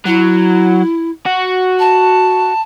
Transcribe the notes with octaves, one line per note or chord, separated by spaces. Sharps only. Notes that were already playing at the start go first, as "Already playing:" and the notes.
F#3 E4
F#4
A5